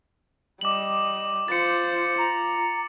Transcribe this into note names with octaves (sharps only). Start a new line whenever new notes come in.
G3 D#5 D6 F#7
F4 C5 A6 C#7
F4 A#5